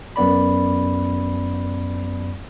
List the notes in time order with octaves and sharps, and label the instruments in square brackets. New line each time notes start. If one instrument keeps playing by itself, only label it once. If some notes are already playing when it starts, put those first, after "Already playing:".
[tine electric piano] F#2 B3 D5 B5